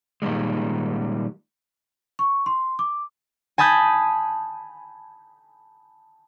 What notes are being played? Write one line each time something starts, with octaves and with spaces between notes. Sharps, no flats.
A#2 D#3 G3 G#3
C#6
C6
D6
G#5 A5 B5 D#6 G6 G#6